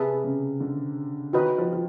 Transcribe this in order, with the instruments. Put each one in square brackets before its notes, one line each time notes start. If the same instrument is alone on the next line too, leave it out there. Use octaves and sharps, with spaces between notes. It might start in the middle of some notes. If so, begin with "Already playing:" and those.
Already playing: [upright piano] C3 [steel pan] G#4 B4 E5 A5
[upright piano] C#3
D3
[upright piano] D#3 [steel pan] F#4 B4 D#5
[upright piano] F3
F3